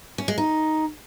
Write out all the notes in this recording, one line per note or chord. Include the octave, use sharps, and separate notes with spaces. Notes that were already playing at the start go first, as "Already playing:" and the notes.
C#4
G#3
D#4